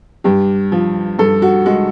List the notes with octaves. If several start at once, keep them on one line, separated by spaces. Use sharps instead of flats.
G2 G4
F3
G2 A4
F#4
G#3 F#4